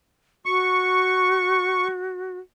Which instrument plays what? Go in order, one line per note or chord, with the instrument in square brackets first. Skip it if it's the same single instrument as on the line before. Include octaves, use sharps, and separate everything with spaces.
[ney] F#4 [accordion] C#6